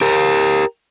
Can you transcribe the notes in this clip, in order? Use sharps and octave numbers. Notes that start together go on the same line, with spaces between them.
G4 A#4